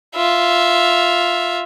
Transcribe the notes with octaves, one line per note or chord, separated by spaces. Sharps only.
F4 E5